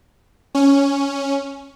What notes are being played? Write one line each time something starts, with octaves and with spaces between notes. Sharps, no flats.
C#4